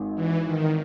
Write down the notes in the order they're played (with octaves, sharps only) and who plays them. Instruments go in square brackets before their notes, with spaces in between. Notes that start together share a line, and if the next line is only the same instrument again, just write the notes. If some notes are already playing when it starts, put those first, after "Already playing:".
Already playing: [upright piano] G#1 G#2
[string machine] E3
D#3